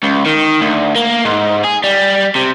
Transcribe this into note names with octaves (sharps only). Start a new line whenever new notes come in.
C#2
D#3
D2
A#3
G#2
G#4
G3
C3